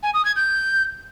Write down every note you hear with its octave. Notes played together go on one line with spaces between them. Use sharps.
G#5
D#6
G#6
G6